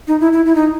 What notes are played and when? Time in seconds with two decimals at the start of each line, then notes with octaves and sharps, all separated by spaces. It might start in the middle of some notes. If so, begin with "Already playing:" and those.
0.08 D#4
0.20 E4
0.33 E4
0.46 E4
0.55 D#4